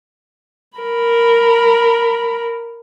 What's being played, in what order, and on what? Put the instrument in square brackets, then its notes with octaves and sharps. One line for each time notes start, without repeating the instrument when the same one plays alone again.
[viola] A#4 B5